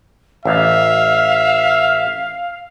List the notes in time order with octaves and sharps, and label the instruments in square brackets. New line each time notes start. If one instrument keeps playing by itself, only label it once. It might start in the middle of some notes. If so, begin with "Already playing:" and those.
[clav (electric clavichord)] A1 [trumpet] E5 [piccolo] F5